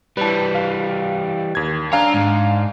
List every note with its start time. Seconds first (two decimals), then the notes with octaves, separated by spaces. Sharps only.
0.17 E3 G3 B4 A5
0.55 F5
1.55 D#2 G#6
1.92 D4 C#5 F5 G#5 A#5
2.14 G#2 G#3